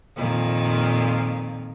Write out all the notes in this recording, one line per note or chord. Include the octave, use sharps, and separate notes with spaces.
F2 A#2 D#3